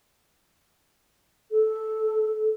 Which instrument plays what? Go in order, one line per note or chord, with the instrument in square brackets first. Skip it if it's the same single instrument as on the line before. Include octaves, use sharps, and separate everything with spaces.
[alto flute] A4